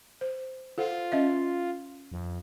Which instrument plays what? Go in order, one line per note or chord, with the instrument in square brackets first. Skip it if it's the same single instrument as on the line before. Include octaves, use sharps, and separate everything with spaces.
[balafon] C5
[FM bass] F4 [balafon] A4 C5 F#5
[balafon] C#4 D#5 E5
[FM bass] F2